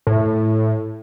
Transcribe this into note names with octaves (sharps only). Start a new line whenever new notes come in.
A2